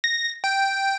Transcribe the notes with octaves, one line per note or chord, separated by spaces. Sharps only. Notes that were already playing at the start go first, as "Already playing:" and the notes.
A#6
G5